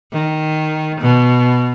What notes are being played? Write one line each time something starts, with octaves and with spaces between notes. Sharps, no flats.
D#3
B2